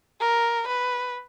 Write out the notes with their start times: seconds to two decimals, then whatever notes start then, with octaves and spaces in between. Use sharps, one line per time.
0.20 A#4
0.68 B4